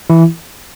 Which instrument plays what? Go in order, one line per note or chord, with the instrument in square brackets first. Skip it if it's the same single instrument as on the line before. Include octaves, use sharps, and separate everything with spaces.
[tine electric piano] E3 E4